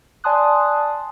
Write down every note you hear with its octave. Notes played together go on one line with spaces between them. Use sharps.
D5 G#5 A5 C6 D#6 F#6